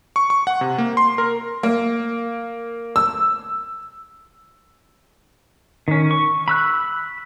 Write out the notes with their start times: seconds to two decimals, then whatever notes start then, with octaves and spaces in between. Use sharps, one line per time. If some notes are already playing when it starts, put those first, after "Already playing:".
0.16 C#6
0.30 C#6
0.47 F#5
0.61 C3
0.78 A#3
0.97 C6
1.18 A#4
1.63 A#3
2.96 E6
5.88 D#3 C#4
6.11 C#6
6.48 B5 E6 F#6